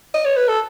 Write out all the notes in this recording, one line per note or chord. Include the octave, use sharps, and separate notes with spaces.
D#5
C#5
B4
A4